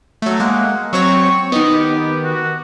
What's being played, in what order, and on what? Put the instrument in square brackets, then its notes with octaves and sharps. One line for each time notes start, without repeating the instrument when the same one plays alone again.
[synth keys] F#3 A3
[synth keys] G#3 A#3 [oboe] F#5
[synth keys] F#3 C4 C#5 [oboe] C#6
[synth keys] D#3 B3 [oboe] D#5
[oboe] G4
F#4